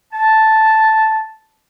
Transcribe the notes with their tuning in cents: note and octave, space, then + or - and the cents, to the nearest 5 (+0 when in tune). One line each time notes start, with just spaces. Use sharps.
A5 -5